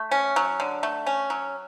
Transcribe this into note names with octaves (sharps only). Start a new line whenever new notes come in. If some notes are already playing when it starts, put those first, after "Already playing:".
Already playing: A3
C#4
F#3
D3
A3
C#4
F#3